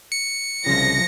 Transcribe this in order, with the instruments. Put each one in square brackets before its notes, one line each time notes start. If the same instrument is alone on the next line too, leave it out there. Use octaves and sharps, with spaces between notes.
[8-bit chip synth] C#7
[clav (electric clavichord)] C2 C#3 [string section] F3 A#6